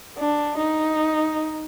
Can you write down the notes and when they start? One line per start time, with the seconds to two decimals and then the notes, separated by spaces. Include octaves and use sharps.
0.18 D4
0.58 D#4